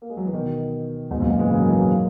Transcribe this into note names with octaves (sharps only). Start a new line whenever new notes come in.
A#3
G#3
F#3
E3
B2 D#3
G#2 B2
F#2 A#2
G#2 B2
E3 G#3
C#3 E3
D#3 F#3
E3 G#3
F#3 A#3